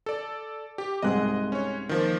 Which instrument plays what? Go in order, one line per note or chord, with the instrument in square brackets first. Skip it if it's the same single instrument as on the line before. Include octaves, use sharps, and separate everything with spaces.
[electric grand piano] A4 D5
G4
[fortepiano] C2 G#2 G#3 [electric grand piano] D#5 F#6
[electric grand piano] C#4 C#5
D#3 F3 A#3